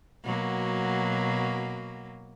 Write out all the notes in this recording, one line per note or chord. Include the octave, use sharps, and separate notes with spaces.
B2 F#3 A#3